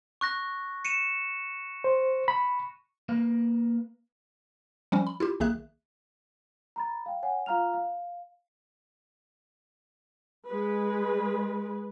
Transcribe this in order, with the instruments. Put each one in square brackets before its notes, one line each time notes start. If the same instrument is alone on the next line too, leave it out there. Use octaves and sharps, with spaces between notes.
[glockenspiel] C#6 F#6 A#6
C#7 D#7 E7
[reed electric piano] C5
B5
[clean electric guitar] A#3 B4 F5
[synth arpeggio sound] F3 G3 C#4
B5
E4 F4 G4
B1 D#3 A#3 G#4 E5 F#6
[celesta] A#5 B5 A6
F5 G5
C#5 F#5 G#5
F4 F5 A#5 F6 F7
F5
[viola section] G#3 B4